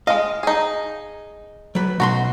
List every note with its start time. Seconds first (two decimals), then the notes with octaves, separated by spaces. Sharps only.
0.07 G#3 D#5 F5
0.43 D#4 G#4
1.75 F#3 B4
2.00 B1 F#4 A#5 C6